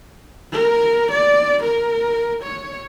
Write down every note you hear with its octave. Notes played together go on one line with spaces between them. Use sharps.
A#4
D5
A#4
C#5